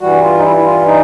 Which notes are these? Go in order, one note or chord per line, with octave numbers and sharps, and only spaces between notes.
G2 E3 G3 F#4
F4
D#4
E4
E4
F4
D#4